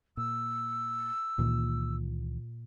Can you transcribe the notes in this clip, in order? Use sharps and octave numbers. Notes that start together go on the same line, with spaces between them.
A#2 E6
C#2 A#2 D#3 E3